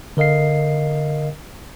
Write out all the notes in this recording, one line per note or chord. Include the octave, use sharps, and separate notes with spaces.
D3 A#4 D#5 F5 C7